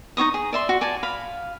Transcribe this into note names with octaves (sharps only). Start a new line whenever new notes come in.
D#4 F4 C#6 D#6
G#4
D5 E5 C6
F#4
D5 G#5 A5
F5 B5